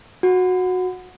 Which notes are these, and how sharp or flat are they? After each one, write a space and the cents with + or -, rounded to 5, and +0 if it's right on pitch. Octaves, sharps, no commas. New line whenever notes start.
F#4 -15